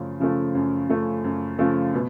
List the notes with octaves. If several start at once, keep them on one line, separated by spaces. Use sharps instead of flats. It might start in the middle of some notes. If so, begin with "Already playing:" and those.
Already playing: F#2 C#3 F3 A3
C#3 F3 A3
F#2
C#3 F3 A3
F#2
C#3 F3 A3
B2